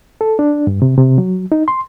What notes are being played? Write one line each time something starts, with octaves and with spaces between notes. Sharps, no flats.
A4
D4
G2
C3
C3
F#3
D#4
C6